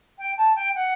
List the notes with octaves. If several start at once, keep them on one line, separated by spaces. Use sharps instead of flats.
G5
A5
G5
F#5